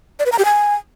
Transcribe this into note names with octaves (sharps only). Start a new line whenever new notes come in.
D5
B4
A#5
G4
G#5